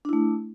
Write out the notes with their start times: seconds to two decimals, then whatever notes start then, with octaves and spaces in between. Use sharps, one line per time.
0.05 D4
0.09 E4
0.13 A3